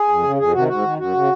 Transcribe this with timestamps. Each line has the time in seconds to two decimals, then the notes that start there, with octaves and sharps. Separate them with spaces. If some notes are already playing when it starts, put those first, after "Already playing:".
Already playing: G#4
0.08 F2
0.23 C#3
0.38 F2 G#4
0.53 C3 D#3 F#4
0.68 G#2 F#4
0.83 D#3
0.98 F#2 F#4
1.14 C#3